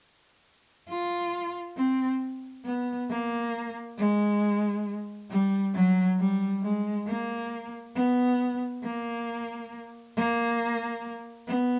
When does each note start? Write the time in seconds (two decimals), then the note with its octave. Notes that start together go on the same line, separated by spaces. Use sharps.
0.89 F4
1.77 C4
2.65 B3
3.10 A#3
3.98 G#3
5.30 G3
5.74 F#3
6.19 G3
6.63 G#3
7.08 A#3
7.95 B3
8.84 A#3
10.17 A#3
11.48 B3